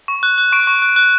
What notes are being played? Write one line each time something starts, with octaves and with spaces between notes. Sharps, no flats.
C#6
F#6
F#6
C#6 D7
C#6
F#6
F#6